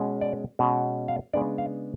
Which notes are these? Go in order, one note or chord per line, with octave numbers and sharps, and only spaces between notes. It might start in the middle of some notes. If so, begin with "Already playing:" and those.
Already playing: B2 G#3 C#4
D5
B2 G#3 C#4
F5
C#3 G#3 B3 D4 D5
F5